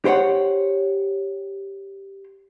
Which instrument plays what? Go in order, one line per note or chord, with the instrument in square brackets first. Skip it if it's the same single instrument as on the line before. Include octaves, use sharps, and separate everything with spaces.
[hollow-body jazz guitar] G4 C5 C#5 F#5